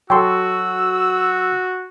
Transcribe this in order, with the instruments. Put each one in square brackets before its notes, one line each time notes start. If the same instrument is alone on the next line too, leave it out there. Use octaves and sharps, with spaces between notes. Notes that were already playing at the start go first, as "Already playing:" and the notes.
[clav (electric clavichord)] F#3 A4 [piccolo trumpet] F#4 [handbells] G5 C6 [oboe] E6